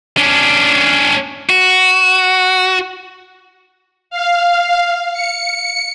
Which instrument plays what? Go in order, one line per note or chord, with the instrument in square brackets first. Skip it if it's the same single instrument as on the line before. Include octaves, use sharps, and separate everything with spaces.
[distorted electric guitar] C#4 D4
F#4
[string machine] F5
C#7